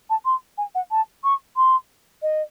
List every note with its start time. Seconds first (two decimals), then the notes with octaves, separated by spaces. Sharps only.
0.10 A5
0.25 C6
0.58 G#5
0.75 F#5
0.91 A5
1.24 C#6
1.56 C6
2.22 D#5